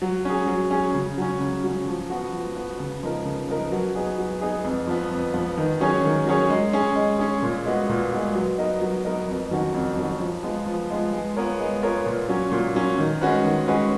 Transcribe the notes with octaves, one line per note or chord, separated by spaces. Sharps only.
F#3
C#4 G#4
F#3
C#4 G#4
C#3
F#3 C#4
C#3
F#3 C#4
F3
B3 F#4
F3
B3 F#4
C#3
F3 B3 D#4 A#4
C#3
F3 B3 D#4 A#4
F#3
B3 D#4 G#4
F#3
B3 D#4 G#4
F2
F3 B3
F2
F3 B3
D#3
F#3 C#4 G#4 C#5
D#3
F#3 C#4 G#4 C#5
G#3
C#4 G#4
G#3
C#4 G#4
A#2
G#3 B3 F#4
A#2
G#3 B3 F#4
F#3
B3 D#4 A#4 D#5
F#3
B3 D#4 A#4 D#5
F2
D#3 F#3 C#4 F#4
F2
D#3 F#3 C#4 F#4
F3
G#3 B3 F4
F3
G#3 B3 F4
G#3
B3 F4 A#4 C#5
G#3
B3 F4 A#4 C#5
A#2
F#3 C#4
A#2
F#3 C#4
D#3
G#3 C#4 F#4 B4
D#3
G#3 C#4 F#4 B4